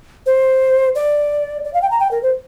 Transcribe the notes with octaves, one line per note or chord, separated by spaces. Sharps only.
C5
D5
D5
F5
G5
A#5
G5
A#4
C5